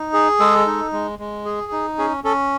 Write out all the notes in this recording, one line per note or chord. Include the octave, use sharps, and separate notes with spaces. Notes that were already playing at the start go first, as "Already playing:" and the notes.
Already playing: D#4
G#4
G#3 A4
D#4
G#3
G#3
G#4
D#4
C#4 G#4
C#4 A4